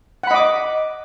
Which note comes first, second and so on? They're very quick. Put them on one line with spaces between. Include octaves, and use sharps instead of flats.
F#5 B5 D#5 D6